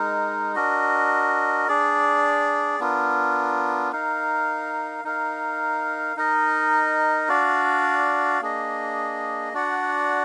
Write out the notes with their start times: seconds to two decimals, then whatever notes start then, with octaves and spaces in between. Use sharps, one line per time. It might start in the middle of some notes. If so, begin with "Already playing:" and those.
Already playing: G#3 D#4 A#4
0.55 D4 F#4 A#4 D#5
1.68 D4 G#4 D5
2.80 B3 D4 F4 A#4
3.92 D#4 A#4 F5
5.04 D#4 A#4 F5
6.17 D#4 A#4 D#5
7.28 D4 F#4 D5 F5
8.41 A#3 D4 G#4 D#5
9.53 D4 F#4 D5 F#5